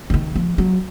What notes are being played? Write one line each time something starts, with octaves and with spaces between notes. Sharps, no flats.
D3
D#3
F3
F#3